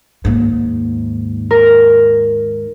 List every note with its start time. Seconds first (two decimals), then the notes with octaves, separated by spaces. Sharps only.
0.25 D#2 G#2
1.51 A#4